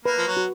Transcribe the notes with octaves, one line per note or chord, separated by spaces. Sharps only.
A#3 B4
F3
F#3
F#4